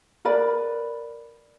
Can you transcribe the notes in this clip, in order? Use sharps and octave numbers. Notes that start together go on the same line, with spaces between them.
A#4 B4 D5 B5